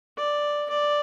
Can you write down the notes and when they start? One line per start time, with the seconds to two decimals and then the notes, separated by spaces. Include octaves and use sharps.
0.18 D5
0.70 D5